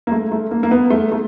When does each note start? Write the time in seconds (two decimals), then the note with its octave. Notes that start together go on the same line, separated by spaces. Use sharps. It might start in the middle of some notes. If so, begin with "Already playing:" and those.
0.07 A#3
0.12 A3
0.32 A3
0.51 A#3
0.63 A#3
0.71 B3
0.90 A3
1.12 A3